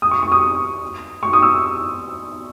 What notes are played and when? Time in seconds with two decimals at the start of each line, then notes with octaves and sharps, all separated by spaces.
0.02 D#6
0.11 C#6
0.22 C#6
0.32 D#6
1.23 C#6
1.33 D#6
1.42 E6